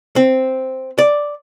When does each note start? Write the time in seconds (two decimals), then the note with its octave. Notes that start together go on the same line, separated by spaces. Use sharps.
0.16 C4
0.98 D5